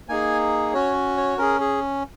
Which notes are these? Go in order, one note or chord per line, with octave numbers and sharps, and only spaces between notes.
A#3 D#4 G#4 G#5
C#4 F#4 C#5
C#5
C#4 G#4 A#4
G#4